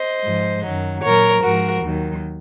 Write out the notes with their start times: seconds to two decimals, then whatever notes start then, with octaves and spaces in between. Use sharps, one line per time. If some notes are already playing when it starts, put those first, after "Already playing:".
Already playing: C5 D#5
0.23 G#2 F3
0.64 F#2 D#3 F#3
1.03 A#2 F#3 A#4 C#5
1.43 G#2 F3 F#4 A#4
1.83 D#2 D#3 F#3